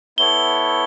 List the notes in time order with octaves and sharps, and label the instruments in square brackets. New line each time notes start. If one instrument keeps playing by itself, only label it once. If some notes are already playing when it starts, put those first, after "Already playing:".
[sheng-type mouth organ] B3 E4 A4 C#5 [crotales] G7